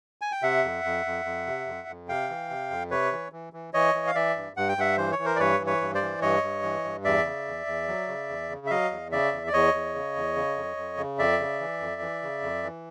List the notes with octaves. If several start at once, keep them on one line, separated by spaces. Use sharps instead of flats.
G#5
G5
C3 E5 F#5
F2
F2
F2
F2
C3
F2
F2
C3 F5 G5
E3
C3
F2
C3 B4 C#5
E3
E3
E3
E3 C#5 D#5
E3
F5
E3 D5 E5
G2
G2 F#5
G5
G2 E5 F#5
E3 C5
C#5
E3
A#4 C5
D5
G2 B4 C#5
E3
B4 C#5
G2
C5 D5
E3
G2 C#5 D#5
G2
E3
G2
E2 D5 E5
C#3
E2
E2
F#3
C#3
E2
C#3
E5
F#3 D#5 F5
E2
C#3 D5 E5
E2
D5
E2 C#5 D#5
E2
C#3
E2
C#3
F2
F2
C#3
F2 D5 E5
C#3
E3
F2
E3
C#3
F2
E3